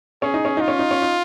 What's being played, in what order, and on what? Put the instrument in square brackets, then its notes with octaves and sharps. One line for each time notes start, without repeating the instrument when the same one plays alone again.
[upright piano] C#4 [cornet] G#4
[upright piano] D#4
C#4
[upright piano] D#4 [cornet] F4
[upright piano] C#4
D#4
C#4
D#4